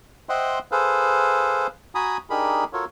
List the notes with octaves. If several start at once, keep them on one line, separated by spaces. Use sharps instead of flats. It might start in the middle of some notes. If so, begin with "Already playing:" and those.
C5 D#5 E5 F#5 G5 C6
G#4 A4 B4 C5 F5
F#4 G#5 A#5 B5 D#6
D4 D#4 G4 G#4 A#4 B5
F4 F#4 A4 A#4 C#5